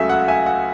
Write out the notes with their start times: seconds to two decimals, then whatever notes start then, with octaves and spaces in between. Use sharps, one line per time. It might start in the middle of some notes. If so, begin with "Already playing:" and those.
Already playing: C#2 C#3 F#3 A3 E5 G#5
0.09 F#5
0.28 E5 G#5
0.46 F#5